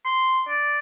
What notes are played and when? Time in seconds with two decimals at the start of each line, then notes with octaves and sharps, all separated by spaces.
0.05 C6
0.49 D5